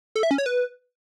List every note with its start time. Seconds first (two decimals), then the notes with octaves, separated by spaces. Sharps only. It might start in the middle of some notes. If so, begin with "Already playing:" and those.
0.16 A4
0.23 E5
0.31 C#4
0.38 C#5
0.46 B4